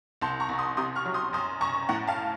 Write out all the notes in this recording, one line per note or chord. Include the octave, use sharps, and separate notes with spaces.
C2 A5 C6
A#5 C#6
C2
C6 D#6
C3 C6 D#6
C#6 F6
F#3
C6 D#6
F#2 C6 D#6
F#2 A#5 C#6
A2 F#5 A#5
F5 A5